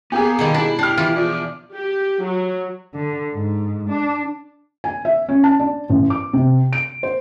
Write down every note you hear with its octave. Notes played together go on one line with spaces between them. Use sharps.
A#3 B3 G4 G#4
B2 D#3 G3 A4 F#5
D4 E4
D4 G4 F6 C7
E3 F4
E2 F3 D5
G4
F#3
D3
G#2
D4
G#5
E5
C#4
A5
D4
A1
D6
C3
D7
C5